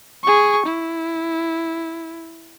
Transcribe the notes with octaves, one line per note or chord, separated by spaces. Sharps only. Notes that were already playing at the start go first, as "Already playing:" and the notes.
G#4 C#6
E4